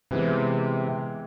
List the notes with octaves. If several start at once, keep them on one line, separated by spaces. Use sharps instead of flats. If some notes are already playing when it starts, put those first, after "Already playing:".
C3 E3 G#3 B3